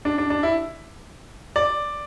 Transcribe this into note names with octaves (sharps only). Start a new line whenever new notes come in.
D4
D4
D4
E4
D5